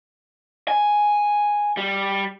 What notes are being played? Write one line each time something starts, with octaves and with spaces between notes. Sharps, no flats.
G#5
G3